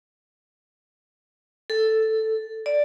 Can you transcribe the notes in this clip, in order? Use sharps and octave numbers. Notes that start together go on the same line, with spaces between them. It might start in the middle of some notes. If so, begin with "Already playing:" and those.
A4
D5